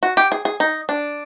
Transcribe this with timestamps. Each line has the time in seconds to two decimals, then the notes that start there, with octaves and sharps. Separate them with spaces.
0.03 F#4
0.17 G4
0.32 G#4
0.45 G#4
0.60 D#4
0.89 D4